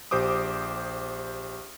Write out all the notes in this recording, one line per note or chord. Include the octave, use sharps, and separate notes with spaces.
A#1 G4 C5 D6 D#6